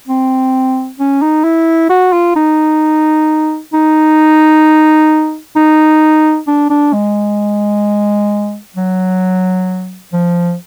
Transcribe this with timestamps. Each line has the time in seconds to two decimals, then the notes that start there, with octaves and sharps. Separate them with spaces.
0.08 C4
0.99 C#4
1.22 D#4
1.44 E4
1.90 F#4
2.13 F4
2.36 D#4
3.73 D#4
5.56 D#4
6.47 D4
6.70 D4
6.93 G#3
8.76 F#3
10.13 F3